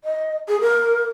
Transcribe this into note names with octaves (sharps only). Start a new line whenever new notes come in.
D#5
G#4
A#4